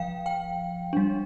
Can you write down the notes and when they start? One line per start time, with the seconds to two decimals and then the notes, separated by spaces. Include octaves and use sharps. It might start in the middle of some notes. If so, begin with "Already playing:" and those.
Already playing: F3 F5 G5
0.26 G5
0.93 G3 D4